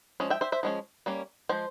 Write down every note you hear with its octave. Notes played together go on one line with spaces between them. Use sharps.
F3 G#3 C#4
E5 G5
C5 E5
C5 E5
F3 G#3 C#4
G3 A#3 C#4
F3 G#3 C5